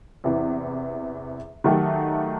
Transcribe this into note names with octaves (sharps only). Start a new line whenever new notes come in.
E2 C3 E3
D#3 F#3 A3 D#4 G4